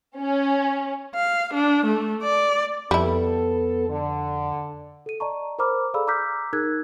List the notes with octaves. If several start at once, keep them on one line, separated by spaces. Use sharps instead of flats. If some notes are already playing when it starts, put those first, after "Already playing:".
C#4
F5
D4
A3
D5
F2 G3 B3 E4 A4
D3
A4 D#7
D5 D#5 A5 A#5 C#6
A#4 C5 A#5 B5 D6 F6
G#4 A4 D5 F5 B5 E6
A#5 D6 E6 F6 G6 B6
D#4 G#4 A#4 E6 F#6 G#6